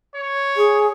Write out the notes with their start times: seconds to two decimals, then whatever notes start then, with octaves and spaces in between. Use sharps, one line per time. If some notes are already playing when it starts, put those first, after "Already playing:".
0.15 C#5
0.57 G#4